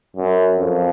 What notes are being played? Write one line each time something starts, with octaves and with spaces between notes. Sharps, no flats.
F#2
F2